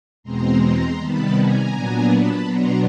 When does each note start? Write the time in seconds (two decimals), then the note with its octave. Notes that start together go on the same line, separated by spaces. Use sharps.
0.23 E2 B2 G#3 C4 A#5 C6
0.59 A#5 C6
0.97 C3 D#3 G3 B3 A5 B5
1.33 G#5 A#5
1.70 A#2 F#3 B3 D4
2.07 A5 B5
2.43 B2 F#3 B3 D4 A#5 C6